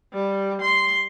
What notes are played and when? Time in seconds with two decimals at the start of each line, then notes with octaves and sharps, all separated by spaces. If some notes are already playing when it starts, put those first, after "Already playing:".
0.13 G3
0.62 C6